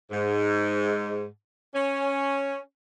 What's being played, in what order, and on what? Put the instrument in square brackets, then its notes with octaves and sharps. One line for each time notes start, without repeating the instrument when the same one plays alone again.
[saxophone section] G#2
C#4